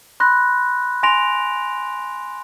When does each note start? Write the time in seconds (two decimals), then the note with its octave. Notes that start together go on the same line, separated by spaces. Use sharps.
0.20 B5 C6 F#6 A#6
1.03 G#5 C6 A#6 D7 F7